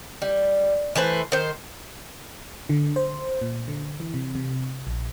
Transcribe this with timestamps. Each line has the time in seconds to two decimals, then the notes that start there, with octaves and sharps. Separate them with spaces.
0.22 G3
0.96 E3 A3 B4 C5
1.32 D#3 C5
2.69 D3
2.96 C5
3.42 A#2
3.68 D3
4.00 E3
4.14 C3
4.35 C3
4.87 A#1